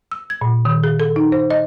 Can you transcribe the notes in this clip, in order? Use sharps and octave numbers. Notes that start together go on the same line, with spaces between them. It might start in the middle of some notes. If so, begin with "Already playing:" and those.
E6
G#6
A#2
D#3
G#4
A4
D#4
C5
D#5